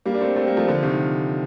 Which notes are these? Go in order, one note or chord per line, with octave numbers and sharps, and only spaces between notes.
G3 A#3
D4
A3 C4
A3 C4
G3 A#3
F3 A3
D3 F3
C3 D#3